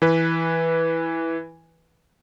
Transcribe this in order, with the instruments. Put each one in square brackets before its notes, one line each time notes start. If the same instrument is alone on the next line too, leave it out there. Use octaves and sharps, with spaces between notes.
[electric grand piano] E3 B4